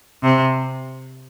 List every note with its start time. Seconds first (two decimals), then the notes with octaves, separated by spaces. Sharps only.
0.23 C3